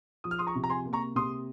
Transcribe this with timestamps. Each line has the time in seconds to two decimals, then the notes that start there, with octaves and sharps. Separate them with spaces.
0.24 F3 D#6
0.31 F6
0.39 C6 D#6
0.47 A#5 C#6
0.55 C3
0.64 A#5
0.69 G#5 C6
0.86 A#3
0.93 A#5 C#6
1.15 C3 C6 D#6